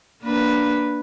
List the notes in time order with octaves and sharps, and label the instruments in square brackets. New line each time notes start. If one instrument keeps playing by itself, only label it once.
[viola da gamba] A#3 D4 B4